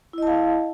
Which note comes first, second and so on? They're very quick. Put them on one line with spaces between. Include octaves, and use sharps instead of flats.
E4 D#5 A5 F5